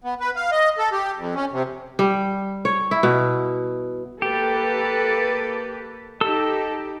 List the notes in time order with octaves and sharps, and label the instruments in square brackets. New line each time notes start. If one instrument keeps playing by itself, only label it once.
[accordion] B3
B4
F5
D#5
A4
G4
F2
C#4
C3
[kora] G3
C#5
E4
B2
[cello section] A#3 A4 B4 [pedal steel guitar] G4
[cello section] D#4 G4 [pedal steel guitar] A4 E6